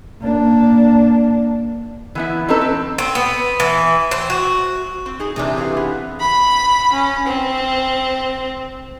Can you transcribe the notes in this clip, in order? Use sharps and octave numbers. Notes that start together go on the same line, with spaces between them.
A#3 D4
E3 B3 E4
C4 C#4 D#4 A4 B4
C4
C4
B3
E3
C4
F#4
C4
D#4 G#4
C3 E3 D4 D#4
G#4 A4 F5
B3
B5
C#4
C4